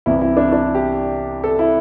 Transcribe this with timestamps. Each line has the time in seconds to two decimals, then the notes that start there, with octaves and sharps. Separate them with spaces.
0.06 C2 C3 E3 E4
0.22 E4
0.37 D4
0.53 D4
0.75 G4
1.44 A4
1.59 E4